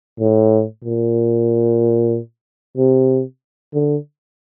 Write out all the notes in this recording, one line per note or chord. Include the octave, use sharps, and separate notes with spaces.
A2
A#2
C3
D3